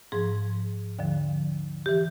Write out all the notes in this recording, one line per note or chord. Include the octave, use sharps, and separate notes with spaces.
G#2 F3 G#4
D#2 D3 F3
E3 G4